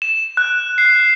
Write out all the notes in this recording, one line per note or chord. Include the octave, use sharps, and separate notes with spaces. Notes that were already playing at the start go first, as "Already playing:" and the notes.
E7
F#6
C7